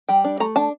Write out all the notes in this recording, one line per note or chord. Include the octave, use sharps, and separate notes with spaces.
G3 G5
D4
A3 A#5
D4 A5